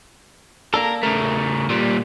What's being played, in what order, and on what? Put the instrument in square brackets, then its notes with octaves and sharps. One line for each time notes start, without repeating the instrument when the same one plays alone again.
[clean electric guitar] A#3 D4 A4 [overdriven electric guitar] A#4
[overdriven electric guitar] C#3 A3 [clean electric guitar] A#4
[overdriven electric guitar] A#2 G3